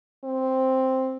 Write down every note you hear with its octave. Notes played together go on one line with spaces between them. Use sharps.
C4